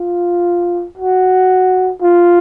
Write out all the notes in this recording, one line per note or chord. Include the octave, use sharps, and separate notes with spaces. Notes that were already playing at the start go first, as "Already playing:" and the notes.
Already playing: F4
F#4
F4